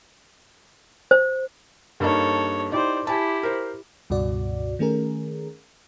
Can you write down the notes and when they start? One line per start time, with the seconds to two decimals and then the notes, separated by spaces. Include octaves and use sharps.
1.11 C5
2.00 G2 A#3 D#4 A4 C#5
2.72 D#4 E4 G4 C5 D5
3.07 E4 G4 G#5 A5
3.43 A#4 C5
4.10 C#2 G2 B2 F#4 D5
4.79 D#3 A3 C#4 G#4 A#4